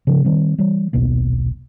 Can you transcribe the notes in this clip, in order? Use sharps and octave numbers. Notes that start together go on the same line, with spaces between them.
C#3 F3
D#3 G3 C4
E3 G3
D#1 B1 B2 A#3